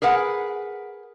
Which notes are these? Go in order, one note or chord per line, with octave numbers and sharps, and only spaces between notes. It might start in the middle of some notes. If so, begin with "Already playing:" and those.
G#4 A#4 B4 F#5